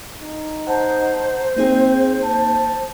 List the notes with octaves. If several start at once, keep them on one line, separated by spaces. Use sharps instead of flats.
D#4
C5 F#5 A5 A#5
A#3 C4 D#4 G#4
A5